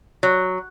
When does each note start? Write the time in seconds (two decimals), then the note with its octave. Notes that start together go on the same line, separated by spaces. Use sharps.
0.23 F#3